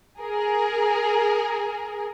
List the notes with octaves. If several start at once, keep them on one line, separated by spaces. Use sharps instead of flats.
G#4 A#4